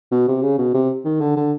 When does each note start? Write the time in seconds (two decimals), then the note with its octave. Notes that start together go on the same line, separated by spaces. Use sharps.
0.12 B2
0.28 C3
0.43 C#3
0.58 B2
0.74 C3
1.05 D#3
1.21 D3
1.36 D3